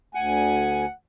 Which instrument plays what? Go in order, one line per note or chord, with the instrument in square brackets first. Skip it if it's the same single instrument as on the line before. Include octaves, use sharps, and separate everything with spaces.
[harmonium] D2 G#5 [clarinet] F#5